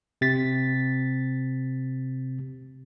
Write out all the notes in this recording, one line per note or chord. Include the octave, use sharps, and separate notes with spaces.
C3 A6 B6